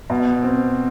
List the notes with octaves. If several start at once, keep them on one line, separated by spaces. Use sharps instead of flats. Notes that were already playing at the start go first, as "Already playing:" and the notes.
B2
C4